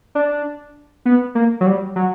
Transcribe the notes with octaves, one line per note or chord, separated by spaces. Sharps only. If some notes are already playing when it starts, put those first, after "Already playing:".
D4
B3
A#3
F#3
G3
F#3